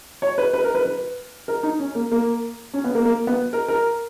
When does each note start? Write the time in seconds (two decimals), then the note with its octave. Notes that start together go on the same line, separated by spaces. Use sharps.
0.22 C#5
0.38 B4
0.53 B4
0.64 A#4
0.75 B4
0.85 B4
1.48 A#4
1.63 D#4
1.80 C#4
1.95 A#3
2.12 A#3
2.74 C#4
2.84 B3
2.95 A#3
3.05 A#3
3.27 B3
3.53 A#4
3.68 A#4